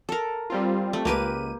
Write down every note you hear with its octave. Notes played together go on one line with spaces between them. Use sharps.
A4 A#4
G3 C4 F4
A3
C#2 A#3 G4 B4 D#7